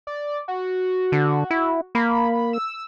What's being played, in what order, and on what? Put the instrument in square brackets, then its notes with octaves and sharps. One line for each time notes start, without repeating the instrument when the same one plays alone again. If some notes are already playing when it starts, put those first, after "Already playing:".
[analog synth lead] D5
F#4
[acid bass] D3
E4
[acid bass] A#3 [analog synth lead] B5
[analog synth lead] E6